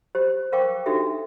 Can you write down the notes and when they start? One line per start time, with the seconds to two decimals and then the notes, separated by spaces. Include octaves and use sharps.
0.15 G4 C5
0.52 A#4 C5 F5 G5 C#6 D6
0.86 D4 D#4 F#4 G4 A4 E5